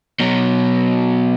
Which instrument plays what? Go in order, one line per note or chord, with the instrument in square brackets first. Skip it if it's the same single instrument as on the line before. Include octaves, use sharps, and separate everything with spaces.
[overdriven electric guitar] B2 F#3